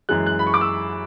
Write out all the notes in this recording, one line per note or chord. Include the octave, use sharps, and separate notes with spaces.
F#2 E3 G#3 F#6
F#6
B5
C#6
D6
E6